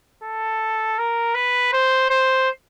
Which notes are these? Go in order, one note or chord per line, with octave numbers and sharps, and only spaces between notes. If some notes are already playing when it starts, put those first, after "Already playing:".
A4
A#4
B4
C5
C5